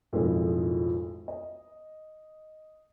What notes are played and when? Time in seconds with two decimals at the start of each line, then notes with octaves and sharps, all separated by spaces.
0.13 B1 F2 A2 D#3 G#3
1.28 D#5